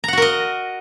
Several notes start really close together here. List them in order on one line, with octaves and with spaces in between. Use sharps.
A#5 F#5 F#4 A#4 D#5